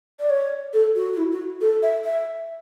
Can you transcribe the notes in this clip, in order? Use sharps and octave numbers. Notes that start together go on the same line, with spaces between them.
D5
C#5
A4
F#4
F#4
E4
F#4
A4
E5
E5